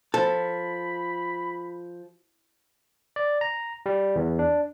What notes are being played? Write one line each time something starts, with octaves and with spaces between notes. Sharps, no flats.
F3 A4 B5
D5
A#5
G3
E2
D4